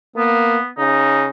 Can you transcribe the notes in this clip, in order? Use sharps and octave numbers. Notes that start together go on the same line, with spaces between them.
A#3 B3
C#3 D#4